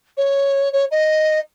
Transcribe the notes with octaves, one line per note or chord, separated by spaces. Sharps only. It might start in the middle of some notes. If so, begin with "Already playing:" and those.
C#5
C#5
D#5